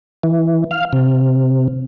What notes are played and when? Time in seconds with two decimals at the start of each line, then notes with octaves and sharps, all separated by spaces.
0.24 E3
0.71 F5
0.93 C3